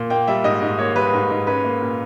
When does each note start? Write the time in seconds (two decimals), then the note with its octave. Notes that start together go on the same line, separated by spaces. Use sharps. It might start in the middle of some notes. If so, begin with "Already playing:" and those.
Already playing: A#2
0.10 A#3 G5
0.27 G3 E5
0.44 G#2 D#5
0.62 G#2
0.78 A#3 C#5
0.95 G3 B4
1.13 G#2
1.30 G#2
1.47 C#4 B4
1.64 A#3
1.82 A#2